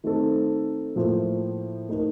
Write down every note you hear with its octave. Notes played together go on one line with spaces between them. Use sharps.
D#3 A3 C4 D#4 A4
A2 F3 A#3 F4 C5
A3 D#4 A#4